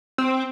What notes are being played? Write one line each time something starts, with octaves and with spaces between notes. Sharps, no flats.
C4